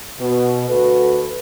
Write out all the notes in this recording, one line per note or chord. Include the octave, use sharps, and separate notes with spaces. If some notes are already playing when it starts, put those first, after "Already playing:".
B2
D2 F#4 A4 B4